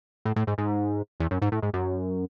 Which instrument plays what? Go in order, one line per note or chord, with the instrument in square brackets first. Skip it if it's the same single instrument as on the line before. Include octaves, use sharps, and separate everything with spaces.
[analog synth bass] A2
A2
G#2
G#2
E2
F#2
G#2
A2
G#2
F#2